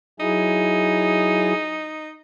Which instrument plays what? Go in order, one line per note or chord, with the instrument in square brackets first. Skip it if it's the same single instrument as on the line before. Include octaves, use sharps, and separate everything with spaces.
[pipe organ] F#3 E4 G#4 [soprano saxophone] D#4